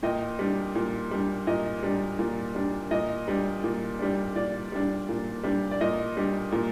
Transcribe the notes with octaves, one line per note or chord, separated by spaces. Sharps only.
A#2 D#5 G5
G3 D4
A#2
G3 D4
A#2 D#5
G3 D4
A#2
G3 D4
A#2 D#5
G3 D4
A#2
G3 D4
A#2 D5
G3 D4
A#2
G3 D4
D5
A#2 D#5
G3 D4
A#2